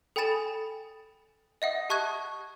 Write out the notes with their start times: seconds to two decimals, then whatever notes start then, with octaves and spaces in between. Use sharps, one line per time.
0.16 A4 G5 G#5 B5 A6 E7
1.62 D#5 E5 F#5 D#6
1.90 G4 A5 C#6 D#6 F#6 G#6